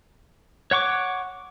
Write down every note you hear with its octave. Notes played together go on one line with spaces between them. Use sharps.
C#5 F#5 C#6 D6